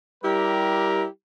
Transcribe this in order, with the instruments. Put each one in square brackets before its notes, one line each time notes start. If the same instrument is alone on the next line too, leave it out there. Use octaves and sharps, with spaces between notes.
[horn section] G3 E4 G4 A#4